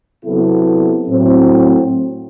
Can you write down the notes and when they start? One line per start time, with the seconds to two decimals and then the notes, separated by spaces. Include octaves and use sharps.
0.23 C3 F#3 B3 E4 A4
1.08 A2 F#3 C4